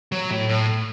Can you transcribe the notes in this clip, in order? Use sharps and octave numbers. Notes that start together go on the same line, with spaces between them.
F#3
A2
A2